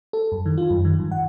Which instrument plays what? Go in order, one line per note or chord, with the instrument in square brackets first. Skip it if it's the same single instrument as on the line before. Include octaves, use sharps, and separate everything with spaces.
[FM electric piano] A4
F#2
D#3
F4
F#2
D#3
G2
F#5